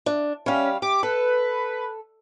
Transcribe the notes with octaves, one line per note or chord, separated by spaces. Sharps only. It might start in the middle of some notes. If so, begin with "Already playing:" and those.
D4
G3 C#4 F5
G4 D6
A4 B4